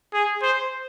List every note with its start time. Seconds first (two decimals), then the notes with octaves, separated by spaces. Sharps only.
0.14 G#4
0.42 C5